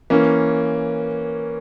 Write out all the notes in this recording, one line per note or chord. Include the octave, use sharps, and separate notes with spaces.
E3 A#3 C#4